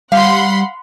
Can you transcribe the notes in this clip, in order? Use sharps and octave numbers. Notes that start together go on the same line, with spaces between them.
G3 F5 F#5 B5 C6